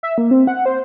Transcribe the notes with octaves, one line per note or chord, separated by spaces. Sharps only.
E5
A#3
C4
F#5
C5